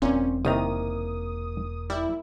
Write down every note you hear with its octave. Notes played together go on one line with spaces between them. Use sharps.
E1 A#2 C4 C#4
C2 D#3 A#3 A#5 D#6
G3 E4